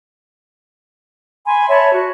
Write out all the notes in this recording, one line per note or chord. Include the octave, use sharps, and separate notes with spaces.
G#5 B5 C6
C#5 E5 A5 B5
F#4